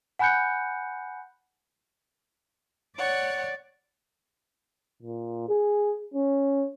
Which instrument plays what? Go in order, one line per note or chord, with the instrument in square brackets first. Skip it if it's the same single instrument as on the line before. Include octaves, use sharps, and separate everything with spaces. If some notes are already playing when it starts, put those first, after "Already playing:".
[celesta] F#5 G#5 B5 F#6 G6 C#7
[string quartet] C#5 F#5 [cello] D5
[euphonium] A#2
G#4
C#4